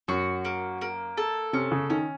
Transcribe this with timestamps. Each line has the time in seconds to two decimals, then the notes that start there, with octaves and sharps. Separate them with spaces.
0.08 F#2 F#4
0.45 A#3
0.81 A#3
1.17 A4
1.53 C3 C#4
1.72 C#3
1.90 D#3 C#4